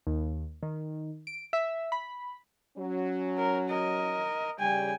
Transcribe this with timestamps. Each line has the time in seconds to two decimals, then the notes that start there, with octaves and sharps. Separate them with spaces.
0.07 D#2
0.63 D#3
1.27 D7
1.53 E5
1.92 B5
2.77 F#3 C#4
3.38 A#4
3.69 A#4 D#5
4.59 C#3 G3 G5 G#5